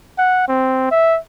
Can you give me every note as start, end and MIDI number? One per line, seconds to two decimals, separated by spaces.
0.18 0.44 78
0.48 0.89 60
0.91 1.18 76